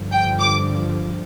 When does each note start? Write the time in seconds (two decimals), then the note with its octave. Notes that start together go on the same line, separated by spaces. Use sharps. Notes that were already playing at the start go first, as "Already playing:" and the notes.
Already playing: G2 D3 F3
0.12 G5
0.39 D6